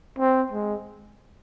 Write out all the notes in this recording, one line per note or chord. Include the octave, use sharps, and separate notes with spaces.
C4
G#3